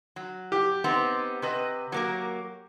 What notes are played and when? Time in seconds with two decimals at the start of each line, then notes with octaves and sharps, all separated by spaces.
0.16 F#3
0.52 G4
0.84 B3 C4 D#4
1.42 C3 B4 D#5
1.92 F#3 A#3 A#4